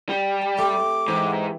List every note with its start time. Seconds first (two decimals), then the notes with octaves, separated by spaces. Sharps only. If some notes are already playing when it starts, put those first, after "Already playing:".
0.09 G3
0.41 A5
0.58 A3 C4 G4 D6
1.08 G#2 E3 G4